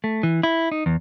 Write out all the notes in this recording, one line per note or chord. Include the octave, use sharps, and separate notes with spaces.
A3
E3
E4
D#4
E2